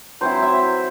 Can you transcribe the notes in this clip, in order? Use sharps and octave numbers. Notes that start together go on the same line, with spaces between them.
F#3 C4 E4 C5
E5